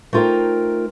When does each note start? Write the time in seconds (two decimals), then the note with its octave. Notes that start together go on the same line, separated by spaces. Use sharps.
0.13 A3 D#4 F4 A#4 C5 G5